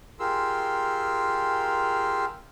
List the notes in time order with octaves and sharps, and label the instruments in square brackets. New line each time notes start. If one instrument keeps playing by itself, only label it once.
[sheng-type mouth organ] F4 G4 G#4 A#4 C6 E6